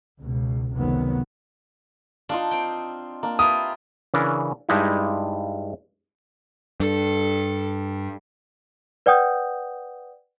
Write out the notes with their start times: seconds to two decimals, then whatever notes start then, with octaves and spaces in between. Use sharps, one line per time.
0.20 C#2 B2
0.73 F1 C#2 C3 D#3 F#3 B3
2.29 D4 D#4 F4 D#5 F5
2.51 C4 G5
3.23 A#3 D4
3.39 E4 F4 G4 A#4 B4 D#6
4.14 C#3 E3 C#4 D4 A#4
4.69 G2 G3 G#3 D#4 E4
6.80 G2 A4
9.06 B4 D5 F#5 G5 D#6 G6